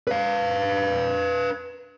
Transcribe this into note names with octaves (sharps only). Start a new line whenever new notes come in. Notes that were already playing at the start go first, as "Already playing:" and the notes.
B4 F5